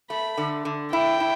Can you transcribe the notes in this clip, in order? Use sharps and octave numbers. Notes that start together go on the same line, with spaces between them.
A3 B5
D3
D3
E4 G5
E4